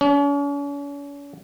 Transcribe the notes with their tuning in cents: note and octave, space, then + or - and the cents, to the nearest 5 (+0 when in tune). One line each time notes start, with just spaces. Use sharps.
C#4 +45